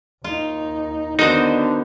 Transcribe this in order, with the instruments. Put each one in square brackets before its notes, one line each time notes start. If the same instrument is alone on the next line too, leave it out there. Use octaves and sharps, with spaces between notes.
[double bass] D#2 D#4 [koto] F4
[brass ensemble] D3 [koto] D#3 F#4 C5 [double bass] B3 [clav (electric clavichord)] D#4